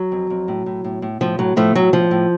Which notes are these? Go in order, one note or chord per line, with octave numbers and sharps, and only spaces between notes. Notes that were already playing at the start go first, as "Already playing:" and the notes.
Already playing: F#3
F2
F2
A2
A2
A2
A2
A2 F3
A2 F#3
A2 F3 A3
A2 F#3
A2 F3
A2